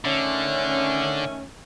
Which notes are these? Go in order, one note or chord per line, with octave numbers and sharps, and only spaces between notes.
D3 D#3 A3 C#4